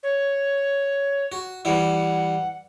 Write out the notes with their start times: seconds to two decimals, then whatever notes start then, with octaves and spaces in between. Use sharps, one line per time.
0.03 C#5
1.32 F#4
1.65 E3 G3 E4 F#5